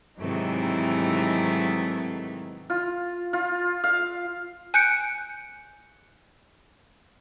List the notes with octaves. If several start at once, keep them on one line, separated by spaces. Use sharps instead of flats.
G#2 C3 D#3 E3 F#3 A3
F4
F4
F5
G#5 F#6 G6 C#7 D7